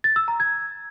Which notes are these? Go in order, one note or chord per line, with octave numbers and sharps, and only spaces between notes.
A6
E6
A#5
G#6